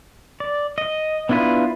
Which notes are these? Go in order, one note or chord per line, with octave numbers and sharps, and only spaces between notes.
D5
D#5
B3 D4 E4 F4 B4